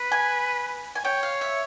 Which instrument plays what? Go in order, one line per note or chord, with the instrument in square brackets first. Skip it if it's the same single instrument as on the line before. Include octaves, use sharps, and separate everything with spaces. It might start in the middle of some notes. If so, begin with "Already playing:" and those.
Already playing: [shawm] B4
[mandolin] G#5
G#5
[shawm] C#5 [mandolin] G5
[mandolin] F5
E5